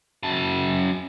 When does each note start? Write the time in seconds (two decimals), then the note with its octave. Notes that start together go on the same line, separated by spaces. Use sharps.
0.23 F#2 A5